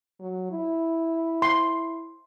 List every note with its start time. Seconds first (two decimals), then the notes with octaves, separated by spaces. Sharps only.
0.20 F#3
0.51 E4
1.42 C6